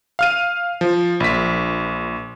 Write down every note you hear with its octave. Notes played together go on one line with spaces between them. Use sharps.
F5 F6 D#7
F3
A#1 B6